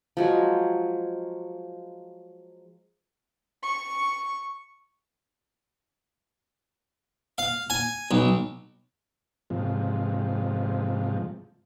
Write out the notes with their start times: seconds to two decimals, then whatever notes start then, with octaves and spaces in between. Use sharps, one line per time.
0.17 F3 F#3 G#3
3.63 C#6
7.38 F5
7.70 G#5
8.11 B1
9.50 G#2 C3 F3